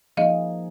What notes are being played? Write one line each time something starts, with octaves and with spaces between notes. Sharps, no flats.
F3 A#3 D#4 G#4 D#5 F5